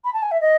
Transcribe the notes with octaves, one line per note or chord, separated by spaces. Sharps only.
B5
A5
G#5
E5
D#5